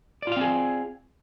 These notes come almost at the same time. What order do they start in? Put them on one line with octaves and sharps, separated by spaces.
D5 F4 F5 C4 G#4